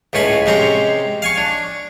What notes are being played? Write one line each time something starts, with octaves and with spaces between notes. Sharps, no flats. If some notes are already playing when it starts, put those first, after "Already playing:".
C#2 A2 C#4 G#5 B5
C3 G#3 C4 C#4 A#5
F5 G#5 C#6
D4